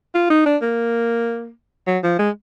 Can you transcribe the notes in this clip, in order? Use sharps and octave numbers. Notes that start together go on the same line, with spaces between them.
F4
D#4
D4
A#3
F#3
F3
G#3